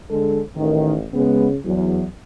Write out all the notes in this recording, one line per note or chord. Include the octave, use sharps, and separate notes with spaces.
D3 G#3 A4
A1 D#3
C#3 G#3 B3
E2 F#3